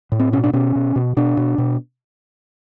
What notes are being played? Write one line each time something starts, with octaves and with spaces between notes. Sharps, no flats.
A2
C4
B2 C#4
D4
B2 C#4
B2
B2
B2 D4
B2
B2